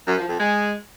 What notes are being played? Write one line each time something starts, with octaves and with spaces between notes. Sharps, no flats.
F#2
F3
F2
G#3